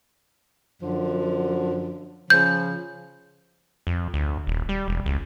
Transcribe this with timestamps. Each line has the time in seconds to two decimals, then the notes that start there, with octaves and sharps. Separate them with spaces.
0.82 F#2 D3 F3
2.30 C#3 F3 G6
3.87 F2
4.14 D2
4.47 D#1
4.69 G3
4.88 E1
5.06 C#2